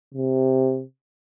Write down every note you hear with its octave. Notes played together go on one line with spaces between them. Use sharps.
C3